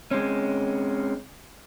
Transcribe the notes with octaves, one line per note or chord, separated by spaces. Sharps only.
G#3 C4 C#4